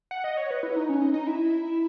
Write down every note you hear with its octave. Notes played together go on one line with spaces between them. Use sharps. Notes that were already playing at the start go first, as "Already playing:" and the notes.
F#5
D#5
C#5
B4
E4
D#4
C#4
D#4
D#4
E4